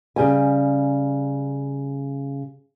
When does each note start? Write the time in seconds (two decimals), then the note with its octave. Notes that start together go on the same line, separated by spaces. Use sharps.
0.16 C#3 G3 G#5